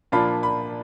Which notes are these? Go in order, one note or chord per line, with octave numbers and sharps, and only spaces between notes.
A#2 F3 A#3 D4 F4 B5
B5